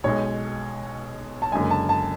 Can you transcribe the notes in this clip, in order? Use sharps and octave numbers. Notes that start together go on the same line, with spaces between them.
B1 B2 G#3 C#5
A5
F#1 F#2 D3 G#3 G#5
A5
A5